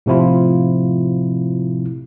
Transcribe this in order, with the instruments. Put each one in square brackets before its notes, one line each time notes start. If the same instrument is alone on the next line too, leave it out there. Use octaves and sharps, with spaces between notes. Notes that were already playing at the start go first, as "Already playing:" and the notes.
[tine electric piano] A2 C3 F3 E4 F4